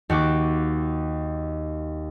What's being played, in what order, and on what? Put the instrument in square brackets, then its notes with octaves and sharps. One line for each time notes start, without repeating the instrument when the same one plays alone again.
[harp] D#2 F#4 D6